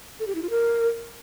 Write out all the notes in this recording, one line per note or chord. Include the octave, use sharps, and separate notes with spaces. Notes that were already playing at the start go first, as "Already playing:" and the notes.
A4
G4
E4
F4
A#4